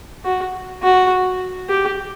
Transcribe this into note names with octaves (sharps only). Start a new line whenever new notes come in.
F#4
F#4
G4